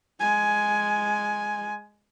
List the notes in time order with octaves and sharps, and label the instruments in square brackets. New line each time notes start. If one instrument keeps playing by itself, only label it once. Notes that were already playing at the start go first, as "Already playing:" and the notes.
[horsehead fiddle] G#3 G#5